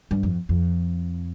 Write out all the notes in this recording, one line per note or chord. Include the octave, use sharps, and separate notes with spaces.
G2
F2
F2